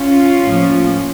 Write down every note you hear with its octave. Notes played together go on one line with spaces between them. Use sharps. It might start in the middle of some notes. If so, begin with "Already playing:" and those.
Already playing: C#4 F4
A2 F3 A#3